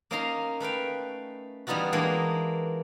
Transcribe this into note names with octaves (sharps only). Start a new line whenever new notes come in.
A#3 C#4 D#4 F5 A#5 C6
A3 B4 F5 G5
E3 G3 B3 D#4 F4 F#4
E3 G#3 A#3 D4 D#4